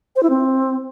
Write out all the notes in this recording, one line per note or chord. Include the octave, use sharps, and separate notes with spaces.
C5
E4
C4